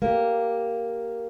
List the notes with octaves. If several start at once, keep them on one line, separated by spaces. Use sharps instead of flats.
A#3 G4